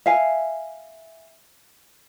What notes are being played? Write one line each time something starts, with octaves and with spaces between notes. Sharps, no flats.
E5 F5 G#5